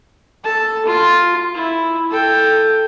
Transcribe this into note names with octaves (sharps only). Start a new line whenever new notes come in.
A4 A5
F4
E4
A4 G5